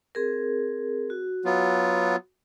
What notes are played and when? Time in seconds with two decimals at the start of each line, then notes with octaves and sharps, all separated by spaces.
0.15 C4 G#4 A#4
1.10 F#4
1.45 F#3 B3 F4